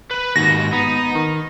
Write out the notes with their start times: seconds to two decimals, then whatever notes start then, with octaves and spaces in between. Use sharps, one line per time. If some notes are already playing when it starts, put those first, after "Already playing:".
0.11 B4 B5
0.36 D#2 G#2 F#4 A#6
0.73 B3 D#4
1.15 D#3